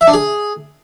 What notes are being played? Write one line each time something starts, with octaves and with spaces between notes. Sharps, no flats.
E5
D4
G#4